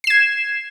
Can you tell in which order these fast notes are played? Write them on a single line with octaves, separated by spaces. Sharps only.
C7 E7 G#6